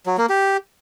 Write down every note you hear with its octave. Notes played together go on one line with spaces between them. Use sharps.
F#3
A#3
G4